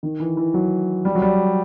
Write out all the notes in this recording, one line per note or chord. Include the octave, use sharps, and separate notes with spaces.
D#3
E3
E3
F#3
G3
F#3
G3